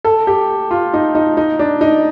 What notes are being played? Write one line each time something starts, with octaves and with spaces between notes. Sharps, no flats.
A4
G4
F4
D#4
D#4
D#4
D4
D#4